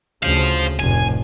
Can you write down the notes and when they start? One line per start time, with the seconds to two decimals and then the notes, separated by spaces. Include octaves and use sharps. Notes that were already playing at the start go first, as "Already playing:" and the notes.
0.23 D2 C#3 C5 F5
0.79 F1 A2 G#5